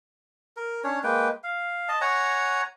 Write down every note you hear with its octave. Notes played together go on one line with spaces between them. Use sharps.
A#4
C#4 D4 C#5
G#3 A#3 B4 G5
F5
D#5 A5
C#5 F#5 G#5 A#5